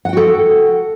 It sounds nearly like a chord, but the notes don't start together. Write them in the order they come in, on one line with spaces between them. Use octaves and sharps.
F#5 G5 F#4 A4